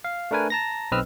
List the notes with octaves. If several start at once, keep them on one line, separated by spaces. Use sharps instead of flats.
F5
A3 D4 A#4 B4 G#5
A5 A#5 A#6
B1 C4 B4 D#5 E6 F6